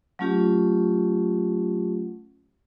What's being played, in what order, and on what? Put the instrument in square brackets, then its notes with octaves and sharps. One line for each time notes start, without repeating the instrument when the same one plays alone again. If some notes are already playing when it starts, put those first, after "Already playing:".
[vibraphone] F#3 A3 C#4 F4 G4